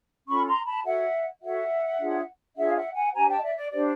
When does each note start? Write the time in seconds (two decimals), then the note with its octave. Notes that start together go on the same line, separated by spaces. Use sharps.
0.27 C#4 F4 A4 B5 C#6
0.46 A#5 C6
0.65 A5 B5
0.84 F#4 A4 C#5 E5 F#5
1.41 F#4 A4 C#5 E5 F#5
1.99 D4 F4 G#4 C#5
2.56 D4 F4 G#4 C#5 E5 F#5
2.68 F5
2.75 E5 F#5
2.94 F#5 G#5
3.13 D4 G4 C5 G#5 A#5
3.28 G5 A5
3.37 D#5
3.42 D5 E5
3.56 D5
3.71 D4 G4 C5 D5